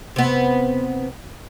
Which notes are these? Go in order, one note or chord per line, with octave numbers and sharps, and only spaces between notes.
C3 B3